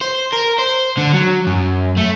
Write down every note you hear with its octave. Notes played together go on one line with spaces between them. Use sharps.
C5
A#4
C5
D3
F#3
F#2
A3